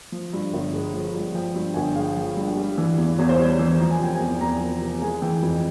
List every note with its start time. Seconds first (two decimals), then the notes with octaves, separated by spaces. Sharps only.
0.12 F3
0.33 G2
0.53 G1
0.73 G#3
0.94 F3
1.15 G2
1.34 F3 G5
1.55 G2
1.74 G1 G#5
1.85 G5
1.96 G#3 F5
2.17 F3
2.37 G2
2.57 G3
2.78 E3
2.98 E2
3.19 E2 C#5
3.29 C5
3.39 G3 C#5
3.59 E3
3.79 F3 A#5
3.91 G#5
4.00 C3 G5
4.14 G#5
4.20 E2
4.41 E2 A#5
4.61 F3
4.82 C3
5.02 G#3 G#5
5.22 E3 G5
5.42 F2